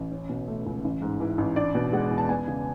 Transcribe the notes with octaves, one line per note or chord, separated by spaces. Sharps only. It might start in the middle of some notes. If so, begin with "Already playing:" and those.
Already playing: A1
C#4
B2
A3
C#2
A1
G#2
E3
A1
D4 D5
B2
G#3 F#5
E2
A5
B3 G#5
C#3